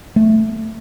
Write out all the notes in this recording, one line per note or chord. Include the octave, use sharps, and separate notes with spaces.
A3